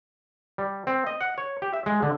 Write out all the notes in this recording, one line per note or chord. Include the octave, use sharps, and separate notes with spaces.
G3
C4
D#5
F#5
C#5
G4
E5
G#3
D3